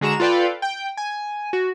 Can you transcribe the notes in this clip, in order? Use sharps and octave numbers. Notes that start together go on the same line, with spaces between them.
D3 G#3 F#4 A#5 E7
F4 A4 B4 D5 F5 G5
G5
G#5
F#4